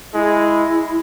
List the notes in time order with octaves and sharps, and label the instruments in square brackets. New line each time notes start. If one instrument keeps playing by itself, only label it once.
[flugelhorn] G#3 [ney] E4